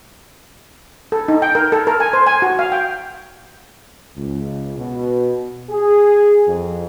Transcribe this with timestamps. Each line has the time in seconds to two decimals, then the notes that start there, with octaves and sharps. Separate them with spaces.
1.12 A4
1.28 D#4
1.42 G5
1.55 A#4
1.72 A4
1.87 A#4
2.00 G#5
2.13 C5
2.27 G#5
2.42 F#4
2.59 F5
2.72 G5
4.16 C#2
4.77 B2
5.70 G#4
6.47 F2